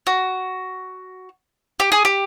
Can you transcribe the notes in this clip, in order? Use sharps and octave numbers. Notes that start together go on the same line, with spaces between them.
F#4
G4
G#4
G4